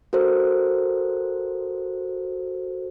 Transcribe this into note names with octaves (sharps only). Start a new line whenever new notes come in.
F#4 A4 A#4 C5